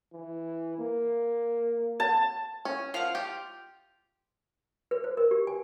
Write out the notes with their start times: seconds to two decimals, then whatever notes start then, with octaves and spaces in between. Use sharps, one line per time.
0.13 E3
0.78 A#3
2.00 A5
2.65 C#4
2.94 F3 F5 F#5
3.15 F4 G4
4.91 B4
5.04 C5
5.17 A#4
5.31 G4
5.47 G#5